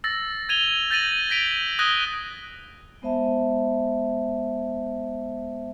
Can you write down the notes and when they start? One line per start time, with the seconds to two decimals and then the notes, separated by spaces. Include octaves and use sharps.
0.04 E6 A6 A#6
0.49 G#6 D#7 F7 G7
0.90 G6 A6 A#6 D#7 F#7
1.30 G6 A#6 B6 D7 D#7 F7
1.79 D#6 F#6 G#6 A#6 D#7 G7
3.02 G#3 B3 C5 E5 A5